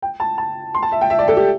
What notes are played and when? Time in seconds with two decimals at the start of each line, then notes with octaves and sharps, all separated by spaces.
0.02 G5
0.20 A5
0.38 A5
0.74 C6
0.83 A5
0.92 E5
1.01 G5
1.10 E5
1.19 D5
1.28 A4
1.37 G4